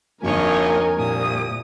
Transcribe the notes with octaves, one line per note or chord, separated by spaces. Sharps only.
G#1 F2 D3 A#3 A#4 C#5 D#5 G#5
C2 A#2 D#6